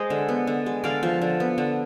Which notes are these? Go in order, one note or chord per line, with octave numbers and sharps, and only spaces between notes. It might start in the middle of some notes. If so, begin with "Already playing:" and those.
Already playing: G#3 C5 D#5
D3
B3
D3
G#3
D3 D5 F5
F3
D3
B3
D3